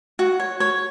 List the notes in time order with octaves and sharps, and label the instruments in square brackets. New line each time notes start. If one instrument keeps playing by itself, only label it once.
[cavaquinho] F#4
C#5
C#5